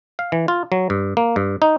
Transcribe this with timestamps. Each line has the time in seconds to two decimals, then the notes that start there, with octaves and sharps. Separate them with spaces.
0.19 F5
0.32 E3
0.48 F4
0.72 F#3
0.90 G2
1.17 A#3
1.36 G2
1.62 D#4